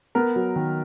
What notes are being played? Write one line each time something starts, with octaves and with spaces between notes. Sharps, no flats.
B3 A#4
F#3
D#3